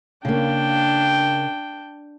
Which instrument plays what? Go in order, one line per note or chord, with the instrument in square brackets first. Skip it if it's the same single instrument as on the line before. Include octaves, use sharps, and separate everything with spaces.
[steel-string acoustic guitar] C#3 A#3 [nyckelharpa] D4 G5